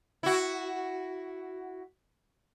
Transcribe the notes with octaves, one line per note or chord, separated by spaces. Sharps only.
E4 F#4